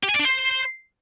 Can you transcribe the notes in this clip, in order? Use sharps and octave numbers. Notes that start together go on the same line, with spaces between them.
G4
G#5
D5
D4
C5